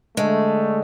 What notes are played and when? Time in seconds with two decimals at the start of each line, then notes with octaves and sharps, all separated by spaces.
0.17 D3 G#3 A3